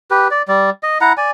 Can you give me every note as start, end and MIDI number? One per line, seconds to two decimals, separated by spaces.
0.11 0.28 67
0.11 0.28 71
0.31 0.42 74
0.48 0.70 55
0.48 0.70 74
0.83 0.98 75
1.01 1.13 64
1.01 1.13 78
1.01 1.13 82
1.17 1.31 74
1.17 1.31 80